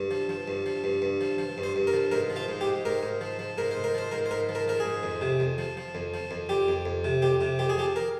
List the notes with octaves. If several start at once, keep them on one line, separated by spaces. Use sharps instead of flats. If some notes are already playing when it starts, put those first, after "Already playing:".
Already playing: G2
F3
F3
G2
F3
G2
G2
F3
F3
G2
C5
G2
A#4
F3
G#2 A#4
F3
F4
G#2
G4
G#2
G#2 A#4
G#2
F3
F3
G#2 A#4
C5
G#2
A#4
F3 C5
G#2 A#4
C5
G#2 A#4
F3
A#4
F3 A#4
G#4
G#2
F2
C3
F2
F3
F3
F2
F3
F2
F2 G4
F2
F2
C3
F2 G4
C3
F2 G4
G#4
F3 G4
A#4